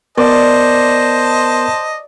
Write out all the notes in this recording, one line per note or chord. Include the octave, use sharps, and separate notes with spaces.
B3 A#4 C5 D5 D#5 A5